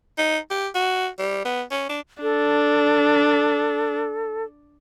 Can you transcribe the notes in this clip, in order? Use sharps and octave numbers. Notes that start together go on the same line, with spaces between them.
D#4
G4
F#4
G3
B3
C#4
D4
D4 A4